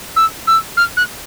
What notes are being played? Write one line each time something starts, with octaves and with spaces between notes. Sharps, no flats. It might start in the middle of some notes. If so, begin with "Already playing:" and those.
E6
E6
F6
F#6